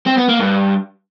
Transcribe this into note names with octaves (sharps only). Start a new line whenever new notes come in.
C4
B3
A#3
G2